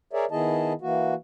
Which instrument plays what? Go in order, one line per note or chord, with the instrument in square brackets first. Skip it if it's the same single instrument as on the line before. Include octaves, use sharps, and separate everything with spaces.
[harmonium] G#4 A#4 C#5 D5 E5
D#3 B3 E4 G#4 D#5 A5
E3 A#3 F#4